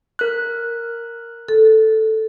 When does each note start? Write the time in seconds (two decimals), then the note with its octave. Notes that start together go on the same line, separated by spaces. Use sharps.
0.19 A#4 F#6
1.49 A4